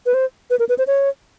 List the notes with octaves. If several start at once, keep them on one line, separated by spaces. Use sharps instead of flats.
B4
C5
B4
A#4
B4
C5
C#5